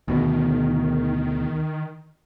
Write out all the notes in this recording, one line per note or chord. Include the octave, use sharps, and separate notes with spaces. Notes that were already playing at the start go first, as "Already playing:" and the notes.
D2 B2 D#3